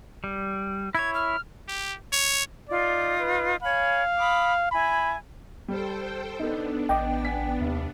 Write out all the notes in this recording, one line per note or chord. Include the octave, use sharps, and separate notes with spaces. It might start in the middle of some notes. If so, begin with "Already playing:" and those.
G3
E4 C#5 G#6
F6
G4
C#5
D#4 F4 D5
B4
C#5 F5 G#5 B5
B5 D6 D#6
E4 G#5 B5
G3 A4 C5 G5
B3 D4 D#4 A4
A1 D#5 G5 D6
F#5 G#5 B6
F1 D#2